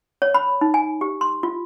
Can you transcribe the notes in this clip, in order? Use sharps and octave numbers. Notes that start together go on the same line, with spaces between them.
C#5
B5
D#4
G#5
G4
C6
F4